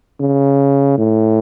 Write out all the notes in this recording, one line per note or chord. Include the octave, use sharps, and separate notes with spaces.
C#3
A2